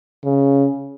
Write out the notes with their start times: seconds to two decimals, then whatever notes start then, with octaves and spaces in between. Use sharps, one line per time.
0.24 C#3